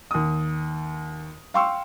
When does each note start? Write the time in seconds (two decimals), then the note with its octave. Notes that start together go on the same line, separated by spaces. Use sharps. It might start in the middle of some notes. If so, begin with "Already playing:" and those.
0.11 D#2 D#6
1.54 F5 G5 C6 C#6 E6